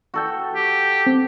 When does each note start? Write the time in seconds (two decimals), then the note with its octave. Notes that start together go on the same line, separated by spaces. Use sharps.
0.14 F#4 A4 G5
0.55 G4
1.07 C4